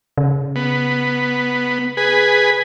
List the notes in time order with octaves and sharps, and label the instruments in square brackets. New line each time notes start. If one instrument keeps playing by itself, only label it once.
[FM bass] C#3
[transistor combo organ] B3
G#4 B4